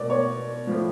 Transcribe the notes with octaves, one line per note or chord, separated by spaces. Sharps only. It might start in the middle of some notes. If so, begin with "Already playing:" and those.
Already playing: B2 D5
C#5
A2 F3